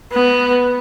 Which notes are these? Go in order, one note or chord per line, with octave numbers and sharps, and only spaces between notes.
B3